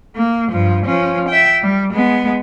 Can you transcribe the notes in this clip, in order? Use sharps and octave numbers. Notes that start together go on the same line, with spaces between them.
A#3
G2 F3
F3 C#4
E5 G5
G3
G#3 B3